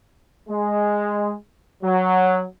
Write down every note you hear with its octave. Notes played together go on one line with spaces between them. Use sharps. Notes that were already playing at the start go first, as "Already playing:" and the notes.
G#3
F#3